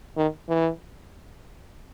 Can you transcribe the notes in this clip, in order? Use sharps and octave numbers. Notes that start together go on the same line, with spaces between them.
D#3
E3